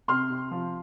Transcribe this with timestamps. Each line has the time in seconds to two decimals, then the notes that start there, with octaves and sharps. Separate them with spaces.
0.08 C3 C6 F6
0.30 C3
0.51 F3